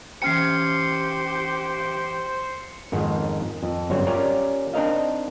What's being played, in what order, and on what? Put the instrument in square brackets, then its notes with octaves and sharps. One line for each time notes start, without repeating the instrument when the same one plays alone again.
[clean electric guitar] E3 C#4 G5 [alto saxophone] G4 [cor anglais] C5 [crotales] C7 C#7
[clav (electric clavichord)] F2 G#2 D#3
F2
G1 F#2 G3 C4 C5 C#5
C#4 F4 G4 A#4 D5 F5
C4 D4 D#4 A#4 D#5 F5